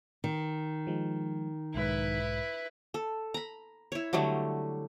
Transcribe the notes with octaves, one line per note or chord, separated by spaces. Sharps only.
D#3
F3 G#3
B1 G#2 E4 B4
A4
A#5 B5
E4 C#5
D3 F#3 G3 A3